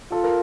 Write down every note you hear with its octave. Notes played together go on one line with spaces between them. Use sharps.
F4 A4
A#4